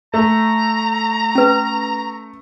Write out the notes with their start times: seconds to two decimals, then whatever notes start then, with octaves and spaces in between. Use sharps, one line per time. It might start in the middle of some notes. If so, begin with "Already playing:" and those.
0.14 A3 A#5
1.35 C#4 B4